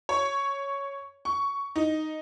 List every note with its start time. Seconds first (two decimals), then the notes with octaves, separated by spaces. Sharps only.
0.09 C#5
1.25 C#6
1.76 D#4